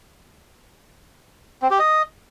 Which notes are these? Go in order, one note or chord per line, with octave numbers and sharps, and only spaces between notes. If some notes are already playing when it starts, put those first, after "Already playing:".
C4
G4
D#5